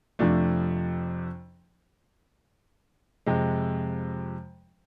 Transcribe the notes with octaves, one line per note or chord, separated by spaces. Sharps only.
F2 C3 F3 A3 D4
F2 C3 G#3